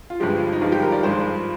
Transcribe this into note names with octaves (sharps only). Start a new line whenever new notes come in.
F4
G1 G2 F3 G#3 G4
D#4
G1 G2 F3 G#3 F4
G4
A#4
D5
G#1 G2 F3 G#3 C5